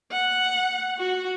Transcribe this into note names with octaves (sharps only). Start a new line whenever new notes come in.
F#5
F#4